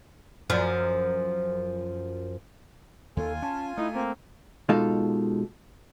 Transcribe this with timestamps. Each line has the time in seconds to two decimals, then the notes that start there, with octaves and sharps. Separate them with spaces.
0.50 F#2 F3
3.17 D#2 D#3 F4 A4 G#5
3.42 C#4 A5
3.78 A3 D#4 E4
3.94 A#3 C4
4.69 B2 G#3 D#4 F4 A4 F5